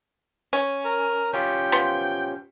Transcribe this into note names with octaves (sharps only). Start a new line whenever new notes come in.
C#4
A#4
C#4 F4 G4 G5
F3 B3 C6